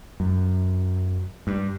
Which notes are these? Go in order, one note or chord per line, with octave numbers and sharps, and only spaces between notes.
F#2
G2